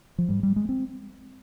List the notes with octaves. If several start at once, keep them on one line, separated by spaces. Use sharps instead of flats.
F3
G#2 G3
G3
G#3
C4